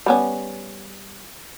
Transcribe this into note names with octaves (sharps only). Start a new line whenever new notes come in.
G3 B3 C#4